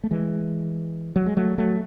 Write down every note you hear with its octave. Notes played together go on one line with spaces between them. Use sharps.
A3
E3 G#3
F#3
G#3
F#3 A3
F#3 A3